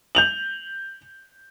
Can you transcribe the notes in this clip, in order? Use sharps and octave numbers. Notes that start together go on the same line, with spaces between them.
G6 F7 F#7